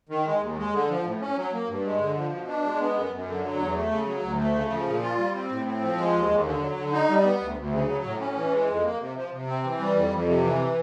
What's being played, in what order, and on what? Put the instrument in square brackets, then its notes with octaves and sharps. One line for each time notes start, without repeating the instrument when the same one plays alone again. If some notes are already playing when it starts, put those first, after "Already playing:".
[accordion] D#3
G#3
D#2
G#3
D3
F3
A2
C#4
F#3
A#3
G2
G#3
D3
F3
B2
D4
G#3
B3
F#2
F#2
D3
F#3
E2
A3
C#3
F#3
D2
A3
C#3
F3
A#2
F4
G3
C4
A2
C4
F3
G#3
D#2
D#2
D3
F#3
D3
D#4
G3
B3
D2
D2
C#3
F#3
A2
C#4
E3
G#3
F2
A#3
C3
F3
C3
C4
E3
G3
F2
F2
C3
E3